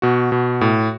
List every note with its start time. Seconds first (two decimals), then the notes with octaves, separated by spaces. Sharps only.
0.02 B2 F#4
0.32 B2
0.61 A2